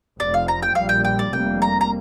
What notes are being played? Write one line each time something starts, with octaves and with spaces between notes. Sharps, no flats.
F1 F2 F3 D5
F5
A#5
G5
A#1 A#2 G3 F5
G5
G5
D5
F1 F2 C3 G3 A#3 G5
A#5
A#5